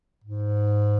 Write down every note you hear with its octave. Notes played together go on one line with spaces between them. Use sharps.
G#2